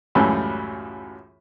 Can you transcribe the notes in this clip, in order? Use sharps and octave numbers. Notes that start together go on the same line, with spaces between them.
C#2 F#2 A2 E3 G3